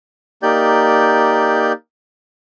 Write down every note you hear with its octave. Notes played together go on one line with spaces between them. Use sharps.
A#3 D#4 G4 D5 G6